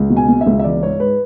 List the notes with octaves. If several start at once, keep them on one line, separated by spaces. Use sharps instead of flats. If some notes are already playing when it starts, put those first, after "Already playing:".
Already playing: C#2
B2
G#5
B2
E5
C#2
E5
E3 D5
G#2 C#5
G#2 B4